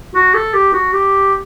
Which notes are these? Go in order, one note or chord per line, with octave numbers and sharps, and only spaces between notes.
F#4
A4
G4
F#4
G4